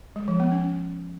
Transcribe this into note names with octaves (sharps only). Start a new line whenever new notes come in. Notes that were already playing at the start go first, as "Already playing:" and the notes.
G#3
F3
B3
C#4